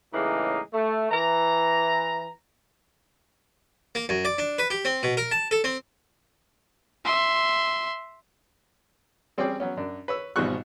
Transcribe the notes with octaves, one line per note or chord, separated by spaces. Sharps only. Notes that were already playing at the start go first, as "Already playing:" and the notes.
A2 C#3 E3 G#3 A#3 D#4
A3
E3 A#5
A#3
F#2
D5
D4
B4
G4
C4
B2
A#4
A5
A4
C4
E5 C6
G3 C4 C#4 G#4 D5 G5
F#3 B3 C#4
F#2 D4
B4 C#5 E6
G#1 B2 F3 G3 C#6 F#6